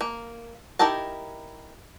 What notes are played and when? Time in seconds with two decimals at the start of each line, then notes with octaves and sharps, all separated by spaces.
0.01 A#3
0.79 D#4 E4 G4 A#4 A5